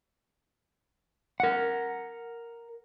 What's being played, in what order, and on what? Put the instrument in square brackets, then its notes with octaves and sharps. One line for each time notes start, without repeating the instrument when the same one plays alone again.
[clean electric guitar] A#4 F#5